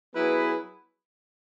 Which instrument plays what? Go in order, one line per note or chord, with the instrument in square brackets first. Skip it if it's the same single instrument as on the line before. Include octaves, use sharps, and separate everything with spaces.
[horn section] F#3 B3 E4 G#4 B4